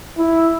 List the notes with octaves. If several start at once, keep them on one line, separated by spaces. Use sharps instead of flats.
E4